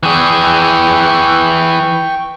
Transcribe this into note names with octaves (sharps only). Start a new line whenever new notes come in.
E3 G#4 G5 C#6